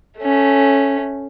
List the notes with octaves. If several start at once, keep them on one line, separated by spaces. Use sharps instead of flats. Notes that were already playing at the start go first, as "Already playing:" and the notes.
A3 C#4